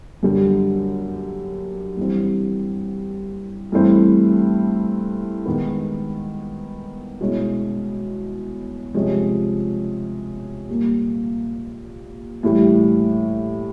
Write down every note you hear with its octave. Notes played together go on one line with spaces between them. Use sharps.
F#2 D3 G3
G2 E3 G3 C4
G2 E3 A3 C4 E4
D#3 G#3 B3
B2 G#3 C#4 E4
C3 F3 G#3 C#4
A#2 G3 A#3
A2 E3 G3